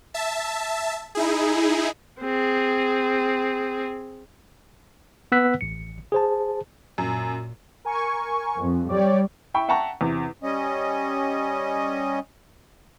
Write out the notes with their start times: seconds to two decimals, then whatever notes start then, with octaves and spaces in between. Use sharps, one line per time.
0.14 E5 A5
1.15 D#4 E4 G#4
2.21 C4 G#4
5.32 B3 B4 F#5 E6 F#6 B6
5.61 A1 C#7
6.12 G#4 C5 A5
6.98 F#2 A#2
7.85 A#4 G#5 C#6
8.59 F2
8.89 G3 G4 C#5 D5
9.54 E4 E5 G5 B5 C#6
9.68 E5 F#5 G5 A5 A#5 C#6
10.01 E2 C3
10.43 G3 C#4 D#5